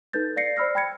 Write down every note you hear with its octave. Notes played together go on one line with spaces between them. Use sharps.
D#4 A4 B4 G6 A6
D5 F5 A#6 C7 C#7
C5 D5 B5 E6 F6 A#6
G5 B5 G#6 C#7